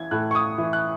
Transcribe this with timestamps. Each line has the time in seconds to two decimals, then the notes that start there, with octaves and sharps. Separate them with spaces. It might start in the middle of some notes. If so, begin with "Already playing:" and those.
Already playing: E3 G#6
0.11 A2 F#6
0.31 C#6
0.35 D#6
0.58 E3
0.73 F#6